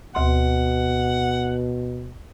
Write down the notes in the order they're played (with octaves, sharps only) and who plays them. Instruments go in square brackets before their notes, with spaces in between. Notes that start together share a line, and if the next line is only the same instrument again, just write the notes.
[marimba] D2 C6 [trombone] B2 [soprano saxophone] F#5